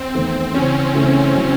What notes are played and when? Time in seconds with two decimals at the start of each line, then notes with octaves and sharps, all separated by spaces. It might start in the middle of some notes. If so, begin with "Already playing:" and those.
Already playing: C4
0.14 E2 D#3 A3
0.54 C#3 E3 C4 C#4
0.94 C#3 E3 A3 D#4
1.35 C#3 F#3 C#4 E4